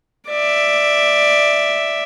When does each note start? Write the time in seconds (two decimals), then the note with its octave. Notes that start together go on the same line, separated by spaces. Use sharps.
0.30 D5 E5